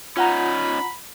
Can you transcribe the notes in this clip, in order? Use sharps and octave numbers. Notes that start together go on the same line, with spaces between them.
C#4 D#4 F4 F#5 A#5 B5